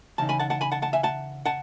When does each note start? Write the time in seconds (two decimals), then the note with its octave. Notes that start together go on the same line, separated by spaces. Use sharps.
0.18 C#3 E3 D#4 A5
0.29 G#5 B5
0.40 F#5 A5
0.50 F#5 A5
0.61 G#5 B5
0.72 F#5 A5
0.82 F#5 A5
0.93 E5 G#5
1.03 F#5 A5
1.45 F#5 A5